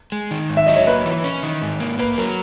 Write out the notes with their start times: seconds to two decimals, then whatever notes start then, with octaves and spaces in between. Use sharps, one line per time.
0.12 G#3
0.31 D#3
0.49 G#2
0.57 E5
0.67 F#3 D#5
0.76 C#5
0.87 A#3 B4
1.05 E3
1.24 C#4
1.43 D#3
1.62 G#2
1.80 A#3
1.99 A#3 B4
2.18 F#3 A#4